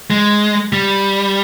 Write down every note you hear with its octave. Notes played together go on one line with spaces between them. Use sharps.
G#3
G3